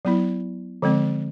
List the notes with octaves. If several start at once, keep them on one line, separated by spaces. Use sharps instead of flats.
F#3 B3 E4
D3 F3 G#3 C4